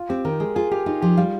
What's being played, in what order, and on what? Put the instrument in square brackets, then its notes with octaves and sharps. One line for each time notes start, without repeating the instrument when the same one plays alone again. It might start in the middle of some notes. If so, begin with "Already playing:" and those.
Already playing: [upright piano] F4
[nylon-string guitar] C4 [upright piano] G4
[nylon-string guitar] D#3 [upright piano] A#4
[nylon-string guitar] G#3 [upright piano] G#4
[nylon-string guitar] F4 [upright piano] G#4
[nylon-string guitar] F4 [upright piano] G4
[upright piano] D#4 [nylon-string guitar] F4
[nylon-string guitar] F3 [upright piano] G4
[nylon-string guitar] G3 [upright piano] F4